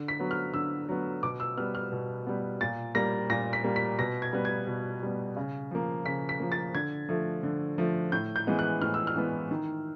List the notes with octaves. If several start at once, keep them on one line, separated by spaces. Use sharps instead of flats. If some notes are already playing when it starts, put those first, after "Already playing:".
Already playing: D3
B6
F#3 B3
F6
D3 E6
F#3 B3
B2 D6
E6
G3 B3 F6
F6
B2
G3 B3
A#2 A6
G3 A#3 A#6
A#2 A#6
B6
G3 A#3
B6
B2 A#6
G#6
G3 B3
G#6
B2
G3 B3
C#3
F3 A#3
C#3 B6
B6
F3 A#3
A6
D3 G#6
F3 A3
D3
F3 A3
A2 G6
G6
E3 G#3 B3
F#6
A2 F6
E6
F6
E3 G#3 B3
D#3